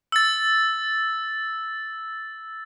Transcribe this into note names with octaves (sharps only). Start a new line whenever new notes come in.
E6 A6